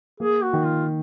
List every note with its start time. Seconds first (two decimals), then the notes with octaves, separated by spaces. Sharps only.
0.20 A#3 G#4
0.42 F#4
0.53 D#3
0.65 F4